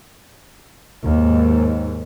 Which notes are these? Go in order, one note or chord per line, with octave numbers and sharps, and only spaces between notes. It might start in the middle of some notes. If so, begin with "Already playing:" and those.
D#2 G#2